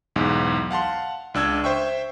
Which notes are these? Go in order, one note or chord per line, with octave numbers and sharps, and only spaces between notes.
B1 E2 G#2
F5 F#5 A5 C6
C#2 D4 E6 G#6
C5 E5 G5 C#6